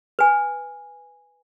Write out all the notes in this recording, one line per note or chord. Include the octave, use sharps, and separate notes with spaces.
B4 G#5